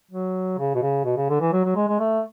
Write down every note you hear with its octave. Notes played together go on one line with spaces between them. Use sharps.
F#3
C#3
B2
C#3
B2
C#3
D3
E3
F#3
F#3
G#3
G#3
A3